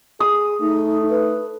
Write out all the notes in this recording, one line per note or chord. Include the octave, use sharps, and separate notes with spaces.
G#4 D#6
A3 D#4
B4